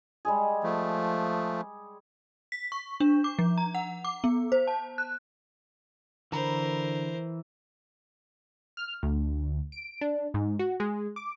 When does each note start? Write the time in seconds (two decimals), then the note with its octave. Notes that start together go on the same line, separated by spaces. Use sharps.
0.25 G3 G#3 G#4
0.63 F3 A3
2.52 B6
2.72 C#6
3.00 D4
3.24 D6
3.39 F3
3.58 A#5
3.75 F#5
4.04 D6
4.24 B3
4.52 C5
4.67 A5
4.98 F#6
6.32 D3 E3 A#4 C5 A#5 B5
8.77 F6
9.03 D2
9.72 D7
10.01 D4
10.34 G#2
10.59 F#4
10.80 G#3
11.16 D6